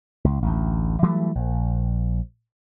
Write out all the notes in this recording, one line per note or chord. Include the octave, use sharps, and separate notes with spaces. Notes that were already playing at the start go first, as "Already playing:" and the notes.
C#2
A1 D2
E3 F#3 G3 A3
A#1